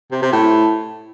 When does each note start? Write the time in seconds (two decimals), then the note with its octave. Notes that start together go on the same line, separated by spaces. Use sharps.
0.11 C3
0.22 C3
0.33 A2